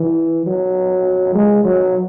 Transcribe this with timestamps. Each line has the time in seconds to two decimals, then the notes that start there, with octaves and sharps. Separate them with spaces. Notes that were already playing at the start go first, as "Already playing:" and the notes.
Already playing: E3
0.46 F#3
1.35 G#3
1.65 F#3